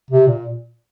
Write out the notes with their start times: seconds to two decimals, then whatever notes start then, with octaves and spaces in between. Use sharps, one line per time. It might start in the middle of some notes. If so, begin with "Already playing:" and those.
0.11 C3
0.28 A#2